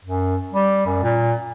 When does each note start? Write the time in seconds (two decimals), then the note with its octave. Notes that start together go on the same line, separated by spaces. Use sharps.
0.05 F#2
0.53 G3
0.87 F#2
1.03 A#2